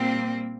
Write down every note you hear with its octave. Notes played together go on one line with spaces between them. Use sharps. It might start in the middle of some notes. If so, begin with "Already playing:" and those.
Already playing: A#2 G3 A#3 C4